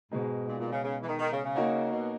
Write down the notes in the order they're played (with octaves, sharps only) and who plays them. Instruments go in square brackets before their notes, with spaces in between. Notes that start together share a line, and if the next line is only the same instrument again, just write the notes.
[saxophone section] G#2 [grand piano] B2 G#3 D#4 G#4
[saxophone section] A#2
A#2
C#3
C#3
E3
D#3
D#3
C#3
C#3
[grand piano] A#3 D#4 F#4 C#5
[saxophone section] B2